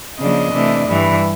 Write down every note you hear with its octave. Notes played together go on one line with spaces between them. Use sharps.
C#3 F3 A#3 D4 D#5
C3 E3 A3 D4
G2 E3 G3